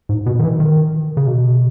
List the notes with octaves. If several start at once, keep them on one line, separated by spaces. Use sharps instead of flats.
G#2
B2
D#3
E3
D#3
C#3
B2